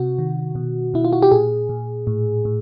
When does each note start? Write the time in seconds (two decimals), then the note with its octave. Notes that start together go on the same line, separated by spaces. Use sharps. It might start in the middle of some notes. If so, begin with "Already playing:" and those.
Already playing: C3 F#4
0.19 D#3
0.55 B2
0.94 B2 E4
1.04 F4
1.13 F#4
1.22 G4
1.31 A#2 G#4
1.69 A#2
2.07 A2
2.45 A2